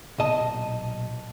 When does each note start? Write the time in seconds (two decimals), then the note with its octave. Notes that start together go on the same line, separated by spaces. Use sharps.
0.18 B1 A#2 D#5 A5